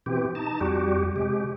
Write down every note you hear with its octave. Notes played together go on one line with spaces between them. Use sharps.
B2 E3 C4 G4
D#4 A5
F2 G3 F#4 G4
C3 G#3 G4